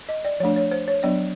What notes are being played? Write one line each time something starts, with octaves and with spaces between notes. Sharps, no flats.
D#5
D5
F3 A3 D4 C#5
C#5
C5
C#5
F#3 B3 D4 D5